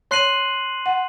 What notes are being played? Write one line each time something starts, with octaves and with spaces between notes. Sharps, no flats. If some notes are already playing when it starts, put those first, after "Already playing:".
C#5 C6 F#6 C7 D#7 F#7
F#5